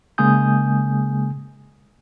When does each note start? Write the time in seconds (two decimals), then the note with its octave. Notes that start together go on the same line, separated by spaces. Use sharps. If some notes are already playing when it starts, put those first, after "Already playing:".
0.18 C#3 G#3 A#3 G#5 D#6 G6